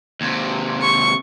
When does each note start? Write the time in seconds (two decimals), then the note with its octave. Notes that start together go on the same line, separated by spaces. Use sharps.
0.21 D#2 C3
0.82 C#6